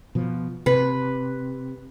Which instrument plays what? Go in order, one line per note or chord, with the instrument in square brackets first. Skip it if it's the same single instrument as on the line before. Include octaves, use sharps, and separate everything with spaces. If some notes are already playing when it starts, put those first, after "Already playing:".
[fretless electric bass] B2 F3
[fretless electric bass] C3 [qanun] B4 B5